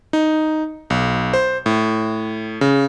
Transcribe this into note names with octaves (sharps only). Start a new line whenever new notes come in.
D#4
B1
C5
A2
C#3